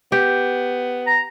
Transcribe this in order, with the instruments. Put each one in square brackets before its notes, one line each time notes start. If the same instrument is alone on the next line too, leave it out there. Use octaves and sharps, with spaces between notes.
[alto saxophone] B3 [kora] G4
[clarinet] A#5